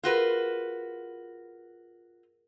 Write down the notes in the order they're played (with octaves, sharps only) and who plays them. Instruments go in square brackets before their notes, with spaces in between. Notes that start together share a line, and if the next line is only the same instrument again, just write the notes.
[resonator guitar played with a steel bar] F4 F#4 B4 [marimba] G#4 A#4